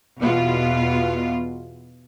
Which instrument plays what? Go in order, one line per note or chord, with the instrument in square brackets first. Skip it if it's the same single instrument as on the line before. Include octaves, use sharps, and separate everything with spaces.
[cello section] E2 B2 B3 F4